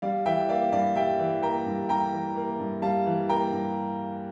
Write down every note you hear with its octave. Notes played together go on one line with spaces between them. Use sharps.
G3 D5 F5
E3 E5 G5
A#3 D5 F5
G2 D5 F5
G3 E5 G5
E3
A#3 G5 A#5
G2
G3 G5 A#5
E3
A#3
G2
G3 F5 A5
E3
A#3 G5 A#5
G2